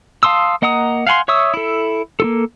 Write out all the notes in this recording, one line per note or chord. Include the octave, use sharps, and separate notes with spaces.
F5 A5 C6 D#6 E6
A#3 D#5 F#5 A#5 D#6
F5 F#5 G#5 B5 C6
C#5 E5 C#6 D#6 E6
E4 A4
A#3 F4 A4